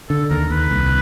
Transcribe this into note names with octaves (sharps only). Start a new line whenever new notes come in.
D3 A4
D#2 A#4
D#2 B4
C2